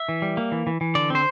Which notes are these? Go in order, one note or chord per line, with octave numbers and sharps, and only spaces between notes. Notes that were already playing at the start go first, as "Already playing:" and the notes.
Already playing: E5
E3
G3
A#3
E3
E3
E3
D3 D5
C4 C5